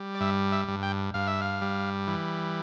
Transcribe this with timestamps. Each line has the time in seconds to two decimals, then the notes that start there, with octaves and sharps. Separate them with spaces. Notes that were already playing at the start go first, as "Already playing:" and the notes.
Already playing: G3
0.15 D5
0.21 G2 E5
0.52 E5
0.68 G2
0.83 G5
1.14 G2 F5
1.27 E5
1.41 F5
1.62 G3
2.07 E3